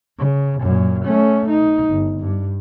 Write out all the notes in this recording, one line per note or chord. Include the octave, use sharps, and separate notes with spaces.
C#3
F#2 A#2
A3 C#4
D#4
G1
G2